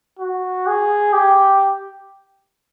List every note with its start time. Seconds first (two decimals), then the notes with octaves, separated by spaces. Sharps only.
0.19 F#4
0.67 G#4
1.13 G4